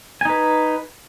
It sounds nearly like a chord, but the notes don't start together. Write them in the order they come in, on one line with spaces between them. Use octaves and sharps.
G#5 D#4 B4